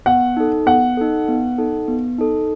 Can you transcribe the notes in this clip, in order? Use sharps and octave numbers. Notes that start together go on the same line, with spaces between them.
B3 F#5
D#4 A4
B3 F#5
D#4 A4
B3
D#4 A4
B3
D#4 A4